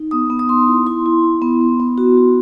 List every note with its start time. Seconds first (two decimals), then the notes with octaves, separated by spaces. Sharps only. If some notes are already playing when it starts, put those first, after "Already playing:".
Already playing: D#4
0.11 B3 D#6
0.30 B3
0.39 D#6
0.49 B3 C6
0.68 E4
0.87 E4 C6
1.06 E4
1.24 E4
1.42 B3
1.61 B3
1.80 B3
1.98 F#4
2.17 F#4